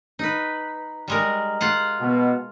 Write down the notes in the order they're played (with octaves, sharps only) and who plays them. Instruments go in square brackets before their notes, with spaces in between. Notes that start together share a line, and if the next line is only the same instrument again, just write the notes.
[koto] D#4 B4
G3 G#3 A#4
F4 F5 F#5
[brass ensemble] B2